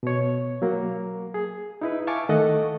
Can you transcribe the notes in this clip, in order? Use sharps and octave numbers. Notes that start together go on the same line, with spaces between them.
B2 C#5
F#3 A#3
G#4
D#4 E4 B4
E5 F5 G#5 A5 C#6 D6
D#3 A3 A4 D#5 F#5